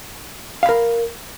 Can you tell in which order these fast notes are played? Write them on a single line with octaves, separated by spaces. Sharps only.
F5 B5 A#4